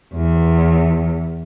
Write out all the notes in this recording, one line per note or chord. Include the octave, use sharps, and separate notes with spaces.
E2